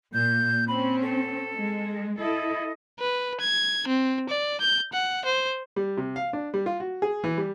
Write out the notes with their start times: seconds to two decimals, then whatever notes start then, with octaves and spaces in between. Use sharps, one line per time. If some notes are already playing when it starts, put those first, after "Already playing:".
0.13 A#2 G6
0.68 C4 C#4 B5
1.02 A4
1.54 G#3
2.18 E4 A4 D#5
2.99 B4
3.41 G#6
3.87 C4
4.29 D5
4.61 G6
4.93 F#5
5.25 C5
5.76 G3
5.97 C3
6.16 F5
6.33 D4
6.54 G3
6.66 F4
6.80 F#4
7.02 G#4
7.24 E3
7.38 G3